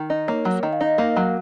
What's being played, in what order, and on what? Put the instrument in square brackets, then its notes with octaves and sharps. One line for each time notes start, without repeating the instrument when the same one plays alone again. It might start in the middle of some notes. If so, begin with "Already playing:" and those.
Already playing: [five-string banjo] D#3
D#4
[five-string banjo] A#3 [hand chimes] C#5
[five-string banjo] F#3
[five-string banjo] D#3 [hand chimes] D#5
[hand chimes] F5
[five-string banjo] D#4 [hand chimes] D#5
[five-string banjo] A#3 [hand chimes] F5
[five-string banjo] F#3